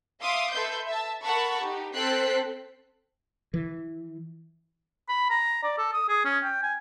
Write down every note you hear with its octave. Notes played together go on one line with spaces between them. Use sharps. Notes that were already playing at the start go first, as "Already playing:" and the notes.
E5 F5 C6 D6 D#6
A4 B4 E5 C6 G6
E5 A5
A4 A#4 F#5 A5 B5 C#6
D#4 G4
C4 A4 G5 F#6 B6 C7
E3
B5
A#5
D5
A4
D#6
G#4
C#4
G5
G#5